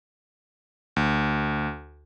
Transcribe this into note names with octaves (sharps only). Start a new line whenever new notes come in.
D2